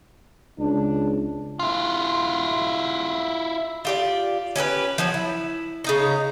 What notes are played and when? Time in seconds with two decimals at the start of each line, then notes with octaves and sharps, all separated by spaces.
0.59 C#2 D4
1.59 E4 F4
3.85 F4 G4 D5
4.56 C#4 G4 A4 B4
4.98 F3 F#3 C#4
5.14 E4
5.84 C#3 D#4 A#5